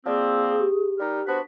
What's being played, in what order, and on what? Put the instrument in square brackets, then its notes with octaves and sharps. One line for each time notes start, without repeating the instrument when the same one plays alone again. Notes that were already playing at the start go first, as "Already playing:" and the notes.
[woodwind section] F3 A#3 C4 [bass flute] G#4 [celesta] D5 E6
[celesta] G4
[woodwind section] G3 D#4 A#4
[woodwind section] B3 D4 F#4 [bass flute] C5 [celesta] B6